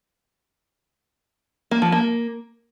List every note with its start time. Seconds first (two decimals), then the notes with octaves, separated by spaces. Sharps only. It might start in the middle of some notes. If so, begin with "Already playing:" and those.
1.71 A#3
1.82 F3
1.92 A#3